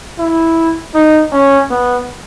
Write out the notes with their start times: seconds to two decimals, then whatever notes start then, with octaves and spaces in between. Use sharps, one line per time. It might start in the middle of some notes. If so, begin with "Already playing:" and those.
0.19 E4
0.94 D#4
1.32 C#4
1.70 B3